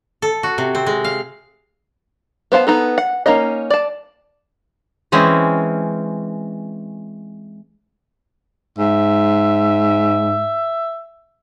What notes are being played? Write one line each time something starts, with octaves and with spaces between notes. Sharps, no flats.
A4
F#4
C3
C4
G#3
F5
B3 C5 F5 A5
B3 D#4 A4
F#5
A#3 C#4 D#4 D#5
D5 A5
E3 G#3 C4 C#4
G#2 E5